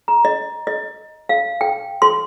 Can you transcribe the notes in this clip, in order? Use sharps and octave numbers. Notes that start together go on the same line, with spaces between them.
A#5
D#5
D#5
F5
G5
C6